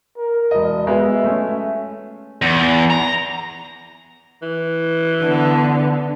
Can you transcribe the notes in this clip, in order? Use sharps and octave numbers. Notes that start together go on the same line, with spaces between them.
A#4
E1 D#5
G#3 B3 F#4 E5
A3 C#4
E2
A#5
E3
D3 B3